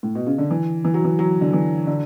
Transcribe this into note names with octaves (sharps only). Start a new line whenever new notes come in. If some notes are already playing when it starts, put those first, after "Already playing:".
A2
B2
C#3
D3
E3
E3
F#3
E3
F#3
D3
E3
D3